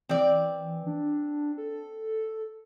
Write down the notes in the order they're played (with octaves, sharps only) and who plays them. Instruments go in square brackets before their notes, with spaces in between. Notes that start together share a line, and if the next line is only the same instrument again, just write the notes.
[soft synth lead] E3 [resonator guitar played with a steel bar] C4 D5
[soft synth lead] D4
A4